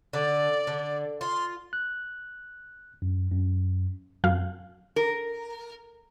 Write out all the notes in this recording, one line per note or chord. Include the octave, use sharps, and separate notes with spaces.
D3 D5
D3
F4 C6
F#6
F#2
F#2
F#2 F5
A#4